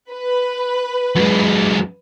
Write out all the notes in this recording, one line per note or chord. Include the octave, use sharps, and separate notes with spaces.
B4
F#2 G#3